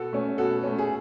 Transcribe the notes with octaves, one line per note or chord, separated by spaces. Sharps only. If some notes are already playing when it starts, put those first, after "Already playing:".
Already playing: B2 F#4 A4
A3 C#4
B2 F#4 A4
A3 C#4
G#4